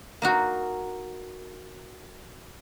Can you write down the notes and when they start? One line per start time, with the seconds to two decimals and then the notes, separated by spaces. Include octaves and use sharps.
0.22 A#3 D#4 F#4